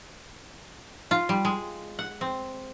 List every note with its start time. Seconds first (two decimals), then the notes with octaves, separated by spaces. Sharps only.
1.11 F4
1.29 G3
1.45 G#3
1.99 F#5
2.21 C4